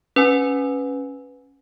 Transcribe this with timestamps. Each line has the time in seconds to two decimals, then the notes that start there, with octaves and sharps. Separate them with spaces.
0.16 C#4 B4 G#5